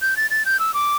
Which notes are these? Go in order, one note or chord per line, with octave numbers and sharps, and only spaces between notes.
G6
A6
A6
G6
E6
D6